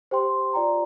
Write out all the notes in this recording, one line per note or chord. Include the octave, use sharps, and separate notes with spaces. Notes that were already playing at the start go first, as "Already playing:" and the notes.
G4 C5 G5 C6
F4 D5 G5 A#5